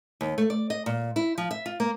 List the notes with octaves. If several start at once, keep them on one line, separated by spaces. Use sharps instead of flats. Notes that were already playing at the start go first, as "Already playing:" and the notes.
D#2
A3
D5
D#5
A#2
E4
F3
E5
F4
A#3